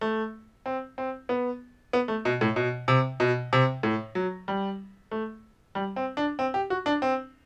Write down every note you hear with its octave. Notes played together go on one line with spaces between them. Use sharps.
A3
C4
C4
B3
B3
A3
B2
A2
B2
C3
B2
C3
A2
F#3
G3
A3
G3
C4
D4
C4
G4
F#4
D4
C4